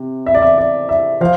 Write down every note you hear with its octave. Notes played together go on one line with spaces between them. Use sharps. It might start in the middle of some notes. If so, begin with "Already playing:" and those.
Already playing: C3
E5
D5
E5
D5
E5
F3 F5